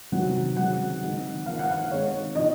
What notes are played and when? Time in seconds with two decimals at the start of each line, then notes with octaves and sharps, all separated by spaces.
0.12 C3 D#3 F#3 C4 F#5
0.57 C#3 F#3 C4 D#4 F#5
1.01 D#3 G#3 C4 D#4
1.46 F3 A#3 D#4 F5
1.59 F#5
1.71 F5
1.90 D#3 G#3 C4 C#5
2.35 C3 F3 C4 D#4 D#5